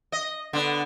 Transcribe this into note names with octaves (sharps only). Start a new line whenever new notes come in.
D#5
D3 B3